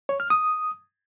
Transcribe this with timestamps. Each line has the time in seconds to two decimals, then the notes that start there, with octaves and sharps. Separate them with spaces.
0.09 C#5
0.20 F6
0.30 D#6